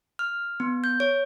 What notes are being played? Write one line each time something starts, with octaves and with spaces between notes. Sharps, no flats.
F6
B3
G6
C#5